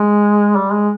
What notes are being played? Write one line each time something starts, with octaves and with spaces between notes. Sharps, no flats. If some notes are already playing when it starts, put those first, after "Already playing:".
Already playing: G#3
G3
G#3